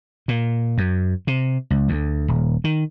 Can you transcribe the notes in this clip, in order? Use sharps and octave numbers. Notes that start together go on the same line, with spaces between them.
A#2
F#2
C3
C#2
D2
D#1
D#3